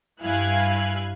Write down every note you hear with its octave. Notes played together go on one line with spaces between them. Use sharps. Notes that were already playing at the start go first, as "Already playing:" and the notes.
G2 E4 F5 G#5 F#6 G#6